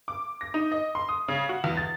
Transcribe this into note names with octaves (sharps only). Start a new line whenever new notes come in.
D6
A#6
D#4
D#5
C6
D#6
C#3
F#4
E2
A6